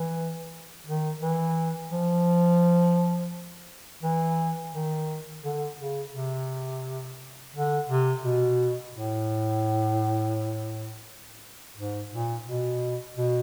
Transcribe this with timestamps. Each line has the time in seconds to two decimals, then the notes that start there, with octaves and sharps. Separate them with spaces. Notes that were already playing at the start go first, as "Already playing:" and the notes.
Already playing: E3
0.86 D#3
1.21 E3
1.92 F3
4.03 E3
4.73 D#3
5.43 D3
5.78 C#3
6.14 C3
7.55 D3
7.89 C3
8.25 B2
8.95 A2
11.77 G#2
12.11 A#2
12.47 B2
13.17 B2